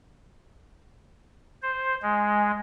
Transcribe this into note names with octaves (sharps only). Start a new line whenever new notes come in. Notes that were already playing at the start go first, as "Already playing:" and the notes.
C5
G#3